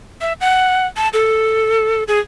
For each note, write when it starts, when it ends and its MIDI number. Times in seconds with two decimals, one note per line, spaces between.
0.21 0.33 76
0.41 0.86 78
0.97 1.09 81
1.13 2.04 69
2.08 2.19 68